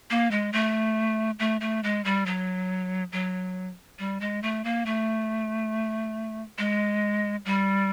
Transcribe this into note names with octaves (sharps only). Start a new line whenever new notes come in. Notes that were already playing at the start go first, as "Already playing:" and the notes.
A#3
G#3
A3
A3
A3
G#3
G3
F#3
F#3
G3
G#3
A3
A#3
A3
G#3
G3